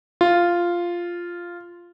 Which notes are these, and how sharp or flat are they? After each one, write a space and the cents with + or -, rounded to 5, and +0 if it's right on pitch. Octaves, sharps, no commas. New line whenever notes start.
F4 -5